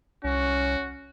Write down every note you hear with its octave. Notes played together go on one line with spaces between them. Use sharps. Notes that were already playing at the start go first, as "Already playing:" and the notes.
C2 C#4 F#4